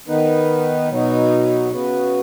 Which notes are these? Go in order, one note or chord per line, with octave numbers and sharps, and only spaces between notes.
D#3 B3 D#4 B4
B2 F#3 B3 D#4 F#4
C#3 B3 F#4 B4